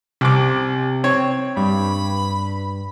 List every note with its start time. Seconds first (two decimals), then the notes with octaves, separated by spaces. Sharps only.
0.21 C2 C3 D6
1.04 C4 C#5
1.57 G2 B5